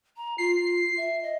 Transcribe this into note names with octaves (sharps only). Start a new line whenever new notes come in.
A#5
F4 C7
E5
D#5